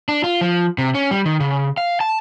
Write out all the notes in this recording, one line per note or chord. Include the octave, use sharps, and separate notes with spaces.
D4
F4
F3
C3
C#4
G3
D#3
C#3
F5
A5